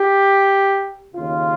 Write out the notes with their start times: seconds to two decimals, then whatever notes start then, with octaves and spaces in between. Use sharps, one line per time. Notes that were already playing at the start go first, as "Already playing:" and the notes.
Already playing: G4
1.15 D#2 C#3 F4